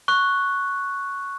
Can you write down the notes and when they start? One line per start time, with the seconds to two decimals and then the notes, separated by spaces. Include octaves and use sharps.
0.08 C#6 F#6